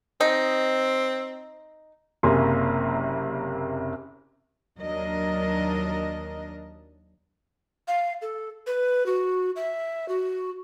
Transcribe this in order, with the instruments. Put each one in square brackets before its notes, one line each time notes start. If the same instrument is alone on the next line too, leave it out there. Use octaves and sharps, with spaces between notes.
[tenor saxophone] C4 [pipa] D#4
[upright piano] F#1 C3 A#3 G#4 C6
[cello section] D#2 F#3 D4 A#4 D#5
[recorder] F5
A4
B4
F#4
E5
F#4